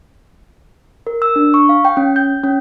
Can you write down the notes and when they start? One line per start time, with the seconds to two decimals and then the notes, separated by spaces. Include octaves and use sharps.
1.07 A#4
1.22 E6
1.36 D4
1.54 C#6
1.69 F5
1.85 G5
1.97 C#4
2.16 G6
2.44 C#4